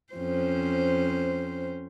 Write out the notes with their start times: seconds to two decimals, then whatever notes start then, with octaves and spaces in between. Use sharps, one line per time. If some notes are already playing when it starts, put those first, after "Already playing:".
0.14 F2 C#4 C5